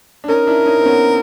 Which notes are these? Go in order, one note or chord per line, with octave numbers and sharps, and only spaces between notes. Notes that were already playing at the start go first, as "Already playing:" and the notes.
D4
C#4 D#4 A#4
D4 E4
C#4 D#4
C4
B3 C#4